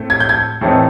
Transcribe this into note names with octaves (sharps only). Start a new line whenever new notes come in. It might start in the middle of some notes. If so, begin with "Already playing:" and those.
Already playing: A2 A3 C4
G#6
G6
G#6
A2 E3 A3 C4 D#4